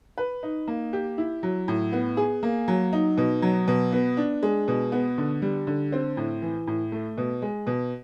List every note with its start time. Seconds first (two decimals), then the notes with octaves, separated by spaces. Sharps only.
0.18 B4
0.43 D#4
0.68 A#3
0.93 G4
1.18 E4
1.43 F#3
1.68 A2
1.92 B3
2.17 G#4
2.43 A#3
2.68 F#3
2.93 D#4
3.17 B2
3.42 F#3
3.68 B2
3.92 B3
4.17 D4
4.43 G#3
4.68 B2
4.92 B3
5.18 D3
5.42 G3
5.67 D3
5.92 C4
6.17 A2
6.42 E3
6.67 A2
6.92 A3
7.18 B2
7.42 G#3
7.67 B2